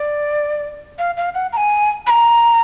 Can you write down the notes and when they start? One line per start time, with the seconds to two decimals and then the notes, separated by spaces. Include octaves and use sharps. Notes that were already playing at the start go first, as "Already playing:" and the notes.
Already playing: D5
0.99 F5
1.17 F5
1.35 F#5
1.53 A#5
1.57 G#5
2.07 B5
2.10 A#5